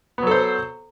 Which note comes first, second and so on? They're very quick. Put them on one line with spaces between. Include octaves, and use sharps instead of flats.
B3 F#3 A4 C5